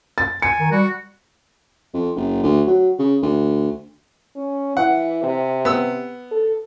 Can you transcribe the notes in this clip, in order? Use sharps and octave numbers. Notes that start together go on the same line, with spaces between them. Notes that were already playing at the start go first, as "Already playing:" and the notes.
A6
G#5 C#7
D#3
G3 F#4
F2
F#1
D2
F#3
C#3
D2
C#4
E3 F#5
C3
B3 E6
A4